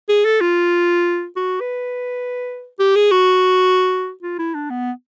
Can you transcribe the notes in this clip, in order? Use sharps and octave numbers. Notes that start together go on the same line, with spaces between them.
G#4
A4
F4
F#4
B4
G4
G#4
F#4
F4
E4
D4
B3